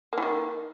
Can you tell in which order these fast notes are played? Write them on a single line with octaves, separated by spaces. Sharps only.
A#3 E3 D#3